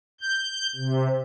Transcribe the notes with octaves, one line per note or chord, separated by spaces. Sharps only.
G6
C3